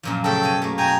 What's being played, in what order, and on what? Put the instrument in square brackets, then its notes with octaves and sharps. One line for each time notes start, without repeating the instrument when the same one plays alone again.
[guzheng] F#2 A#2 F3
[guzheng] C#3 A3 [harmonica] A4 G5
[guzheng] B2 G#5
A3 A#3
[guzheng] B2 [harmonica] G5 G#5 A#5